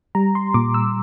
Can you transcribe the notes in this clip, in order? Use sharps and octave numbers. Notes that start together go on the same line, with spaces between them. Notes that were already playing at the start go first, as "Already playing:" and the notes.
G3 A#5
C6
A#2 D6
E6